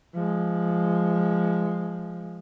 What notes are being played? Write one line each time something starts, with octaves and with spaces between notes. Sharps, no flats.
F3 G#3